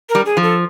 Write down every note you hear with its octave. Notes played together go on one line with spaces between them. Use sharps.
A#4
G3
G#4
F3
A4